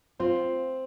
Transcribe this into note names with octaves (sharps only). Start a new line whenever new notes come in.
C4 F4 C5